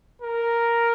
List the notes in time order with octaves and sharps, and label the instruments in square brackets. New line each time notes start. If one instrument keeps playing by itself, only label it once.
[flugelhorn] A#4